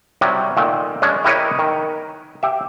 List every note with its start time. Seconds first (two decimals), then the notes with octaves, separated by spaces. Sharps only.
0.21 C3 F#3 G3
0.57 A#2 D#3 A3
1.02 G#3 C#4 D4
1.24 E4 G4 A#4 B4 C#5 D#5
1.59 D#3
2.43 G4 E5